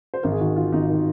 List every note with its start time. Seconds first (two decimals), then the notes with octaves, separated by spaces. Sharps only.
0.14 C5
0.23 G#1 A#4
0.32 G#4
0.41 D#3 F#4
0.56 D#3 F4
0.72 G#1 D#4
0.90 D#3